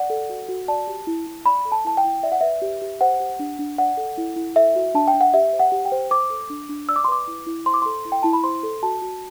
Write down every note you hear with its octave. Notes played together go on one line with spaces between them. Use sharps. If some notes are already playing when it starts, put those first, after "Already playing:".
Already playing: D5 F#5
A4
F#4
F#4
D5 A5
G4
E4
E4
D5 B5
A4
A5
E4 A5
G5
E4
D5 E5
F#5
B4 E5
G4
G4
C5 F#5
G4
D4
D4
D5 F#5
A4
E4
E4
A4 E5
F#4
D4 A5
G5
D4
F#5
G4 E5
C5
F#5
G4
G5
C5
C5 D6
A4
D4
D4
D5 E6
D6
C6
B4 D6
E4
E4
C5 C6
D6
A4 C6
E4
G5
E4 A5
B5
C5 C6
A4
F#4 A5
F#4